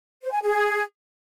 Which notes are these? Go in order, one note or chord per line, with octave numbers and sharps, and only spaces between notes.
C5
G#5
G#4